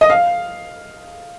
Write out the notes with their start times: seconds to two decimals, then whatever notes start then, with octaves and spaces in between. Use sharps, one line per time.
0.01 D#5
0.10 F5